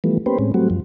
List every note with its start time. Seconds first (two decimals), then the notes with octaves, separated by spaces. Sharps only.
0.04 E3 F3 G3 A3 B3
0.26 A#3 B3 C#4 G4 B4 C5
0.39 A2 G#3 C4 C#4
0.54 F#3 G3 A3 C4 F#4
0.70 F#2 F3